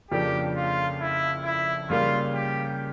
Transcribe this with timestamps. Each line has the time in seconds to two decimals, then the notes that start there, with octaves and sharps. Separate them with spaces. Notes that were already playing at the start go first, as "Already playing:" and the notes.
0.11 F2 C#3 F3 A#3 D4 G4
0.56 F4
1.00 E4
1.45 E4
1.90 C#3 G3 A#3 F4
2.34 G4